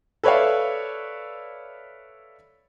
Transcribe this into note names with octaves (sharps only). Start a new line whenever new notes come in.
A4 B4 C#5 D5 E5 F5